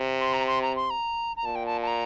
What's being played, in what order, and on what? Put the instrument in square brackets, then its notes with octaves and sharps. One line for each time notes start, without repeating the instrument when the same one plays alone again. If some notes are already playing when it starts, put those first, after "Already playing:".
Already playing: [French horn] C3
[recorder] C6
A#5
C6
A#5
C6
A#5
A#5
[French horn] A#2 [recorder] A5
[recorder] G5
A5
A5
A#5